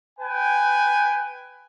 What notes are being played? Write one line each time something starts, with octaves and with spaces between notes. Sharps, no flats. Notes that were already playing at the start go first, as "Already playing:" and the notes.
B4 G5 G#5